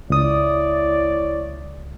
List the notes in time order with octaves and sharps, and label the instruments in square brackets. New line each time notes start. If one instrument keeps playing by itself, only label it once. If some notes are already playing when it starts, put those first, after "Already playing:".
[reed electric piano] C#2 D#6 [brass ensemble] E4 C#5 D5